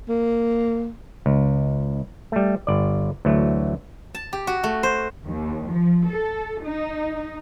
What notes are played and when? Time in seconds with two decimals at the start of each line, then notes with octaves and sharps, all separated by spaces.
0.09 A#3
1.26 C#2
2.32 G3 A3
2.67 G1 D5
3.25 D2 E3 F#3 A3
4.15 A5
4.33 G4
4.47 F#4
4.64 A3
4.83 C5
5.25 D#2
5.71 F3
6.09 A4
6.64 D#4